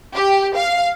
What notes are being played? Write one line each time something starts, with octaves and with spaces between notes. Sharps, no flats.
G4
F5